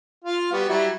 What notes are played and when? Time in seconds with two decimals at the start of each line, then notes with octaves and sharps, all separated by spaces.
0.24 F4 F5
0.52 G3 B3 F#4
0.69 F#3 G3 E4